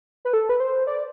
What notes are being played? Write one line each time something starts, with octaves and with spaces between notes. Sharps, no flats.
B4
A4
B4
C5
D5